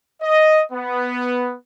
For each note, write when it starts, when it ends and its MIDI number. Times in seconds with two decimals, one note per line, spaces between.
0.22 0.62 75
0.72 1.55 59